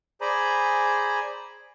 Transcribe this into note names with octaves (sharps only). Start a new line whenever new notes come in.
G#4 C5 D5 G#5 A#5 B5